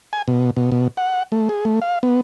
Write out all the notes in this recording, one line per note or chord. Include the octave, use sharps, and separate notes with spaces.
G#5
B2
B2
B2
F#5
A3
G#4
A3
F5
B3